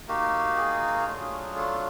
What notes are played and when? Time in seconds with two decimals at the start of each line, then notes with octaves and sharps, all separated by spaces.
0.08 A#3 D#4 F#4 G4
0.57 G#4
1.07 F#3 A3 D4 F4
1.56 A4